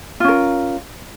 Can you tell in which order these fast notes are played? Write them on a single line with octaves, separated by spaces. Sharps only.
F4 C#4 A#4